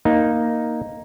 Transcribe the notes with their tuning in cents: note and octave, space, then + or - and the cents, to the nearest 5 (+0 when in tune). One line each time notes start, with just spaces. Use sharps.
A#3 +0 D#4 +0